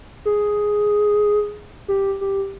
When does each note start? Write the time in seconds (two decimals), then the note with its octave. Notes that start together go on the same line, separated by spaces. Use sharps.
0.25 G#4
1.88 G4
2.21 G4